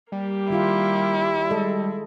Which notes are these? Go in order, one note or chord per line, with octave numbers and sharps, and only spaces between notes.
G3 A#3 G4
D#3 E4 F4 F5
G#3 A4 D#5